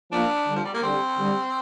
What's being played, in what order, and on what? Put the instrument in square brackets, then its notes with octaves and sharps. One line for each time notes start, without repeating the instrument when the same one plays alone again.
[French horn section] F3 A#3 [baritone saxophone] D4
[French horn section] D3 G3
[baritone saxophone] F3
G3
A#3
[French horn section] D3 G3 [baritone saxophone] C4
[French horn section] D3 G3